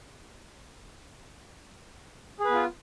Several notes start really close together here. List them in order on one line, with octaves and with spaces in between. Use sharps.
G#4 B4 B3 F4